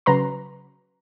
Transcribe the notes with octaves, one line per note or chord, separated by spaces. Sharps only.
C#3 F#3 B4 A#5 C6